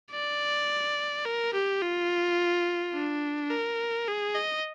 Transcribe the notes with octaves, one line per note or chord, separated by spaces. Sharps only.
D5
A#4
G4
F4
D4
A#4
G#4
D#5